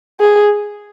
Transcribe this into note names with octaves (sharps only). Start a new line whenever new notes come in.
G#4